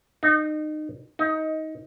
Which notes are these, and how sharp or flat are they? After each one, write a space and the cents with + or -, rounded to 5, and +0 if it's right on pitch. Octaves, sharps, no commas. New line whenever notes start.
D#4 -25
D#4 +20